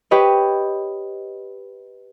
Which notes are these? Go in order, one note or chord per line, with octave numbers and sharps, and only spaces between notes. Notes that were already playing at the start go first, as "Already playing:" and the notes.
G4 B4 C#5 D#5